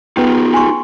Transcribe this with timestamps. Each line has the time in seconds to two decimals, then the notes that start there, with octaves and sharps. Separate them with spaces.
0.17 B3 D#4 F4 G#4 G5
0.54 G#5 C6 C#6